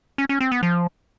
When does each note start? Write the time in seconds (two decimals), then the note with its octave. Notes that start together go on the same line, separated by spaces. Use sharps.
0.18 C#4
0.29 C#4
0.40 C4
0.52 B3
0.63 F3